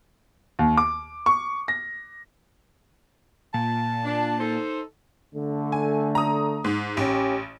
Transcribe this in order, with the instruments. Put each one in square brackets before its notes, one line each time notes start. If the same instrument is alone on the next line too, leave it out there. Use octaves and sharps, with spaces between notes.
[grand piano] D#2
D6
C#6
A#6
[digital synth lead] A#2 [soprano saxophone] A5
[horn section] D4
D#4 A4 C5
[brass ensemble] D3 A3
[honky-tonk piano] G#5
A#5 D#6
G#2
[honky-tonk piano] A1 [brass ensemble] C#4 G4